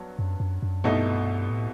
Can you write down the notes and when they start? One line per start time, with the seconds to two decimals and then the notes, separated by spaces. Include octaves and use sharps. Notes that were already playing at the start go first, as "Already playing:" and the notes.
Already playing: G2 F#3 B3
0.19 F#2
0.40 F#2
0.63 F#2
0.84 C2 G2 B2 A3 D#4
1.50 A2